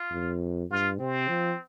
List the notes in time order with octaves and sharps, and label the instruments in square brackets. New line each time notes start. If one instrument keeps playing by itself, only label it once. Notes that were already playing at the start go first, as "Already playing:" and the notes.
Already playing: [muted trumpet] F4
[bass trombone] F2
[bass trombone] G2 [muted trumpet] F4
[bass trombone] C3 [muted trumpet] C4
[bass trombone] F3